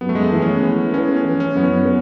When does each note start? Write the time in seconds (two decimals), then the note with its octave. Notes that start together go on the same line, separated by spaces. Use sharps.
0.01 F#2 B3
0.09 A3
0.15 G#3
0.24 A3
0.32 E3
0.42 C#4
0.48 B3
0.63 E3
0.94 B3 C#4
1.17 C#4
1.25 E3
1.40 C#4
1.54 F#2 B3
1.63 C#4
1.85 B3